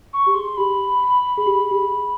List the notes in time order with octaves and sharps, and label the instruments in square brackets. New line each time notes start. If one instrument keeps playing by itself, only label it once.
[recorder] C#6
[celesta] G4
[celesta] G#4 [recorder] C6
[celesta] G4 [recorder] B5
[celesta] G#4
G4
G4
G#4